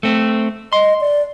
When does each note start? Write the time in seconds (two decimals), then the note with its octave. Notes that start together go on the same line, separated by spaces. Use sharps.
0.03 A3 C4
0.73 D#5 C6
1.01 D5